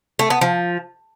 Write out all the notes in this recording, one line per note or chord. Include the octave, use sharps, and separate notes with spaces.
A3
B3
F3